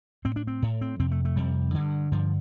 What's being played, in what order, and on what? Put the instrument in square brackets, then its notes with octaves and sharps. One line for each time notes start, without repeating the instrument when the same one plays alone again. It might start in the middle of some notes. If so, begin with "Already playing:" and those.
[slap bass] A2 C4
D4
C4
A2
C4
F2 C3 C4
A3
A3
F2 C3 G3
G2 D3
G2 D3 F3